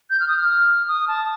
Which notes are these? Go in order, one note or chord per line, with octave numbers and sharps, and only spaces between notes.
G6
F6
D#6
F6
D#6
A5